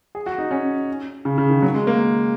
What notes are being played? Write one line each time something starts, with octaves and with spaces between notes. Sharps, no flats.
G#4
F#4
D#4
C#4
C#3
C#3
D#3
F#3
G#3
A#3